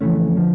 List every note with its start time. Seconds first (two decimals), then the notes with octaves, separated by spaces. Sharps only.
0.01 F2 C#3 E3 A3 C#4
0.37 D3 F3